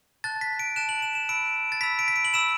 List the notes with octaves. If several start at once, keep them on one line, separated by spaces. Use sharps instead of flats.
A5 F#6 A6
B6
D7
A5 F#6 E7
F#7
E7
E7
B5 E6 D7
A6
B5 E6 B6
D7
B6
D7
F#7
B5 E6 E7